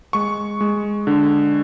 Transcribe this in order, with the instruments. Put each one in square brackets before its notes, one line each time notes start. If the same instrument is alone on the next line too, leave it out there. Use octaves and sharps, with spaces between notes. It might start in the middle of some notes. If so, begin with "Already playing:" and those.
[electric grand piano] G#3 C#6
G#3
D3